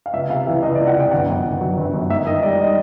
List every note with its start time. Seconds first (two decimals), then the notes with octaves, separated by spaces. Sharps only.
0.06 F5
0.13 C#2 E5
0.30 C3 F5
0.47 E3 E5
0.63 C#2 D#5
0.75 D5
0.78 C#2
0.87 F#5
0.95 C3 G5
1.11 G1 F#5
1.28 F#2
1.45 D#3
1.61 F#3
1.78 G1
1.94 F#2
2.10 G#2 E5
2.27 D#3 D#5
2.42 G3 D5
2.59 D#5